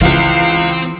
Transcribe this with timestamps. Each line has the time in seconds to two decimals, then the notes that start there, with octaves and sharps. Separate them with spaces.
0.01 C#2 E3 C4 F5